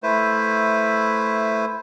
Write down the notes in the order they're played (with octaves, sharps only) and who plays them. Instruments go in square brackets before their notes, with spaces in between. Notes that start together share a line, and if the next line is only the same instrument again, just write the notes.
[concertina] A3 E4 B4 C5